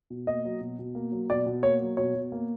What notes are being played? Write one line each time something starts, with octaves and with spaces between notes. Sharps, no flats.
B2
A#3 D#5
F#3
B2
B2
A#3
F#3
B2 D5
B2
A#3 C#5
F#3
B2 C#5
B2
A#3